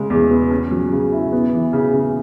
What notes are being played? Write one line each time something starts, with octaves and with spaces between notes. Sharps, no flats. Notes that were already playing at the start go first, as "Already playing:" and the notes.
Already playing: C#3 G#3
E2
B3
C#4
F#3
C#3
E4
B3
E3
C#3
C#3